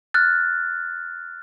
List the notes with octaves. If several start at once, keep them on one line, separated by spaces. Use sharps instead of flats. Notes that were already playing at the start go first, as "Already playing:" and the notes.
F6 F#6 A6